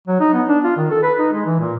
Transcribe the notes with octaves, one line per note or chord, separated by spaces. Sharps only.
F#3
D#4
B3
D4
F4
D#3
A4
B4
D#4
G#3
E3
A#2